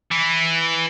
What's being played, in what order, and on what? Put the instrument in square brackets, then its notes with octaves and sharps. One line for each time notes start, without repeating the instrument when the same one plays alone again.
[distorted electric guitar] E3